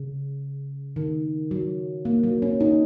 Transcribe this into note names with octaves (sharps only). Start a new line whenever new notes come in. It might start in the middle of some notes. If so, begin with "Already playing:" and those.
Already playing: C#3
D#3
F#3
A#3
F#3
C#4
D#4